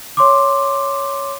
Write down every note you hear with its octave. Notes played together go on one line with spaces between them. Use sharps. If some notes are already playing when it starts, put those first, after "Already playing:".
C#5 C6 D6